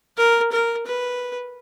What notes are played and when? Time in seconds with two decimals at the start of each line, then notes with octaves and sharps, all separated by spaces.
0.17 A#4
0.52 A#4
0.86 B4